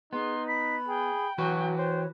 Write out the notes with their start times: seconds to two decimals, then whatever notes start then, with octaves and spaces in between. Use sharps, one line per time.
0.13 B3 D#4 G#4 C6
0.48 B5 B6
0.88 G#4 G5
1.38 E3 F#3 F#4 B4 C#6
1.77 C5 C#5